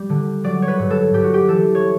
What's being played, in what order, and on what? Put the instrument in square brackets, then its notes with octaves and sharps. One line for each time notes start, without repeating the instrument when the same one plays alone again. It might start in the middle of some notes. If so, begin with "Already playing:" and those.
Already playing: [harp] G3
D3
F#3 D5
C#5
B4
G2
A4
G2 G4
F#4
G4
E3 A4
C#5